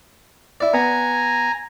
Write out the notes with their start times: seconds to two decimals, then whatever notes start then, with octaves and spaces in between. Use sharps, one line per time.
0.60 E4 D5
0.74 B3 G#5 A#5